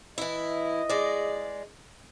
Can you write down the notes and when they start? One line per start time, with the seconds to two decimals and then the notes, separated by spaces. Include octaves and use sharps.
0.18 E3 E4 D#5
0.89 G#3 D5